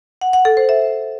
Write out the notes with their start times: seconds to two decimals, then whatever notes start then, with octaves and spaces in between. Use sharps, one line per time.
0.21 F#5
0.33 F#5
0.45 A4
0.57 C5
0.69 E5